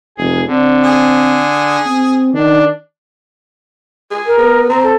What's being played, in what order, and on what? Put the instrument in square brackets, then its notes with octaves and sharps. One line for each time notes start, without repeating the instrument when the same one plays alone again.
[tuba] F1 [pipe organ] G#4
[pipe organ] D3 [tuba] C4
[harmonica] G#4
[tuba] C4
[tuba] D#3 [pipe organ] D4
[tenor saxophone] G#4
[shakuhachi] A#4
[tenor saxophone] B3
[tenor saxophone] C4 [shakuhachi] A#5
[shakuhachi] A4